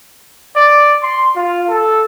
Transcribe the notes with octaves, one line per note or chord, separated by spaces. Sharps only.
D5
C6
F4
A4